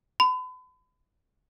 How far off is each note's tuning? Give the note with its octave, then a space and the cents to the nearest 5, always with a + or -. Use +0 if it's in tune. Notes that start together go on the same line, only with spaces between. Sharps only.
B5 +40